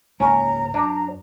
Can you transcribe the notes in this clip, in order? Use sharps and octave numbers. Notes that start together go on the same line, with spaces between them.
C#2 G#2 A#3 C#4 A#5
F#2 D4